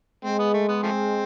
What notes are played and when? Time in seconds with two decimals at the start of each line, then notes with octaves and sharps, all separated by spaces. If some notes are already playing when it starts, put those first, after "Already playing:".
0.25 G#3 C4
0.39 B3
0.54 A3
0.69 B3
0.83 F3 A3 C4